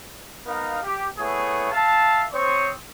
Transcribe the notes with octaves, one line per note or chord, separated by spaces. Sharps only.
B3 D#4 A#4 F5
G4
A3 B3 E4 G#4 C#5
E5 F5 A5
C4 C5 C#5 C#6 D#6